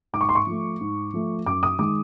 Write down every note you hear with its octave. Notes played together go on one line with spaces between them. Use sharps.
G#2 D6
C#6
C6
C#6
F3 A3
G#2
F3 A3
F#2 D6
D#6
D#3 G#3 D6